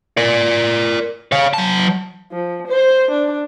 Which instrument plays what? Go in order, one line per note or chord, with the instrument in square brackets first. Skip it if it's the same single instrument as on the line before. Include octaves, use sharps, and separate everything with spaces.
[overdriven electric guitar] A#4 D5
C#5 F5
F#3 A5
[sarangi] F3
C5
D4